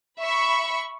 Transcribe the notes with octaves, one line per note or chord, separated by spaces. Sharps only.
E5 B5 C#6